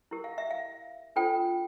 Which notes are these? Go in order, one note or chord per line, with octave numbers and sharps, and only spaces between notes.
E4 G4 A#4
F5
E5
F5
D4 F4 A4 C5 G5